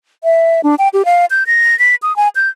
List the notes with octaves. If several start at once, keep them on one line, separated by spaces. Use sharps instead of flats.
E5
D4
G5
G4
F5
G6
A#6
B6
D#6
G#5
G6